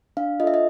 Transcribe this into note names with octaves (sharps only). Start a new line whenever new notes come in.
D4 F5
F4 A4 D#5 E5
D#5